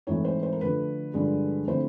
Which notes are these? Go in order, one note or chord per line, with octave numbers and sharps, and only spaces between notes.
G#2 E3 A3 C4 D#4 C#5
C5
C5
A#4
D3 F3 A3 B4
G2 D3 F3 G#3
D3 F3 A3 C4 E4 C5